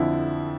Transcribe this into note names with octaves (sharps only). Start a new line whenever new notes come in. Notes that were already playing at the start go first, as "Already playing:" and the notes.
Already playing: F2 D3 F3 E4